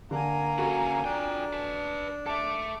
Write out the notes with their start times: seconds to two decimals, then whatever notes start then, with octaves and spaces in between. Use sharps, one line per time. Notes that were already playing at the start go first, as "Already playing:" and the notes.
0.11 D3 A#3 G#5 A#5
0.58 D3 C#4 F#4 A4
1.04 D4 F4 G5
1.53 B4 A5
2.26 A4 E5 A5 D6